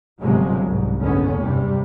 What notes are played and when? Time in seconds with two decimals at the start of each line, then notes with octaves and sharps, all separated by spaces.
0.21 G1 G#2 C3 F3 F#3 G#3
0.66 C2 G#2
0.99 F#1 E2 G#2 D3 B3 C#4
1.40 G2 C3 G3